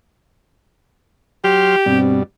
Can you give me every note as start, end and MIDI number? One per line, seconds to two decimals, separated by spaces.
1.44 1.76 54
1.44 1.99 67
1.44 1.76 84
1.44 1.76 89
1.86 2.23 43
1.86 2.23 47
1.86 2.23 55
1.86 2.17 60